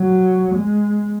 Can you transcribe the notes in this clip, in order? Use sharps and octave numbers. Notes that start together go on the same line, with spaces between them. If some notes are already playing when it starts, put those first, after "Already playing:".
Already playing: F#3
G#3